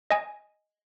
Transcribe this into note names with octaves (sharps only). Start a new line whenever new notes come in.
D#5 G#5